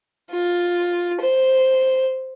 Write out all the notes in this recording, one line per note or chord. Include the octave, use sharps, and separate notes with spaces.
F4
C5